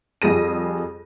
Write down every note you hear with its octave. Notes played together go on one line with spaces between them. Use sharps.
F2 G3 G#4 A#6 D#7